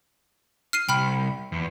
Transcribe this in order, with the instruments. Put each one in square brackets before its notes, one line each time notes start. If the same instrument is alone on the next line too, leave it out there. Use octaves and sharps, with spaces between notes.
[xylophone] F6 C7 D#7
[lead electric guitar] C2 [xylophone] G5 B5 F6
[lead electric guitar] E2